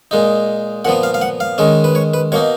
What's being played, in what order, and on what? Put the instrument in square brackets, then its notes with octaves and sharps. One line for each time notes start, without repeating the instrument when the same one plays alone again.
[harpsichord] A#2 G#3 D#4
A#2 F3 B3 F#5
F5
F5
F#5
F5
D#3 G#3 C#4
B4
C#5
B4
B2 A#3 D#4 C#5